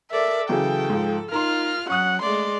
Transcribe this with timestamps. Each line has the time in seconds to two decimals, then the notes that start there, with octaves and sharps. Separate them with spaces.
0.11 A4 A#4 D5 E5
0.49 C#3 E3 F#3 G#4 A4 G5
0.90 G#2 F3
1.32 D#4 F4 A#4 A#5 C6 F6
1.90 F#3 C#4 F#5 C#6 D#6 F#6
2.22 G#3 A3 D5 C6